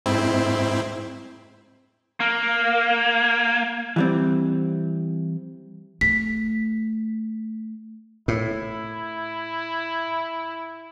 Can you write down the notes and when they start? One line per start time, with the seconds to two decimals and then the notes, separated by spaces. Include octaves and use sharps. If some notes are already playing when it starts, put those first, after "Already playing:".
0.06 G#2 C4 E4
2.20 A#3
3.96 E3 G3 C4
6.01 A3 B6
8.28 A2 E4